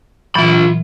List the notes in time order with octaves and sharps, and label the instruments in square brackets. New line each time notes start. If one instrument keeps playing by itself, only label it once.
[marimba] A#2 E3 F#3 [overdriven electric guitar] F4 B5